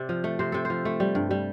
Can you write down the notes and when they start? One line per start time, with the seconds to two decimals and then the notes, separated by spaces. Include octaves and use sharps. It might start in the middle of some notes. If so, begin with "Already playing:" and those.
Already playing: C3 D5
0.09 F3
0.24 A3
0.39 C3 C5
0.52 C3 A4
0.65 F3 C5
0.85 A3
1.00 G3
1.15 G2
1.31 G3